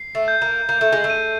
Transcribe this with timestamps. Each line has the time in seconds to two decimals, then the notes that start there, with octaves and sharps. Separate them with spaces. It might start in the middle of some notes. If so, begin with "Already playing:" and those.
Already playing: C7
0.15 A3
0.28 G6
0.42 A#3
0.69 A#3 G6
0.81 A3
0.92 G#3
1.04 A3
1.10 D#7